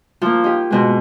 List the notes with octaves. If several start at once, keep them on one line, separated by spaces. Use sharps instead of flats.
F3 A#3
D#4 G4
G#2 B2 G#3